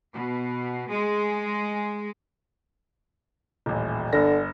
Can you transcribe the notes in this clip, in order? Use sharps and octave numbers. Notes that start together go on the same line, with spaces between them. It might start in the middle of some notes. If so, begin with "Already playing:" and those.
B2
G#3
D#1 A1
G1 D3 A#6